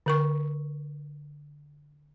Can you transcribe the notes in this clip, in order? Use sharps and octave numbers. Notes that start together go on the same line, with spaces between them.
D3 A#4 C#6